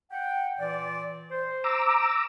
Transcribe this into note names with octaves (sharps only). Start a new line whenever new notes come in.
F#5 G5
A#2 E3 D5
C5
A#5 D6 E6